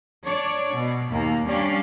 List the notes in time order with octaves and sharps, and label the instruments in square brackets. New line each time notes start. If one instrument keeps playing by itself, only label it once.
[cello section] D4 C#5 D5
B2
D#2 A#3
G3 C#4 D4 D5 F5